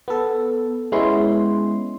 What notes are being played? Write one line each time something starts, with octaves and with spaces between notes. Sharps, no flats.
B3 A4
G#3 B3 C#4 E4 C6